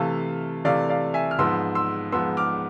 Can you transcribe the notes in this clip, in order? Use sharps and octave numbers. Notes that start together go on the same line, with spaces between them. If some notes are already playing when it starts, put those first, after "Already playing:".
Already playing: C3 E3 A3 F5 A5
C3 E3 A3 D5 F5
D5 F5
E5 G#5
F6
G#2 F3 B3 C6 E6
C6 E6
G#2 F3 B3 C6 E6
D6 F6